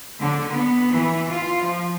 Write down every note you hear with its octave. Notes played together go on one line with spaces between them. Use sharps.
D3
B3
E3
F4
F3